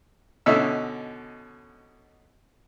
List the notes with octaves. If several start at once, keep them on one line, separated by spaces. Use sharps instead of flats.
B2 D3 C#4 D#4 E5 E6